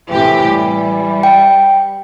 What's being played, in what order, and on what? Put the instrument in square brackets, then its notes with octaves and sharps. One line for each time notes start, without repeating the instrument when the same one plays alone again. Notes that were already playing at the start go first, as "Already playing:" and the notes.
[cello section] A2 C3 G4 [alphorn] E3
[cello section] G3
[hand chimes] G5